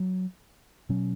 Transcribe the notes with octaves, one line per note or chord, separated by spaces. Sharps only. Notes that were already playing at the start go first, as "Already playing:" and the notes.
Already playing: F#3
B2 F#3 C#4